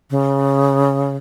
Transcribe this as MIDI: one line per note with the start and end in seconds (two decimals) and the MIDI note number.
0.10 1.16 49